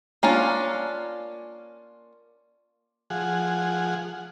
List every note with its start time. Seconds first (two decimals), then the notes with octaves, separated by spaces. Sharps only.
0.23 A#3 C#4 D4 F4
3.10 F3 G#4 F#5